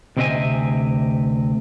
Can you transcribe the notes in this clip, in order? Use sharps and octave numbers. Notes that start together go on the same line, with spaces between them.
D2 C3 C4 D#5 E5 G#5